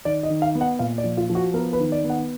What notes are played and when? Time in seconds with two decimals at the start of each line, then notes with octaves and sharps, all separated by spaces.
0.05 D#3 D5
0.23 D#5
0.30 D#3
0.42 F5
0.55 B3
0.61 F#5
0.79 A#2 F5
0.98 D5
1.04 F3
1.17 F4
1.30 F3
1.35 F#4
1.54 B3 A#4
1.73 B4
1.80 D#3
1.92 D5
2.04 B3
2.10 F#5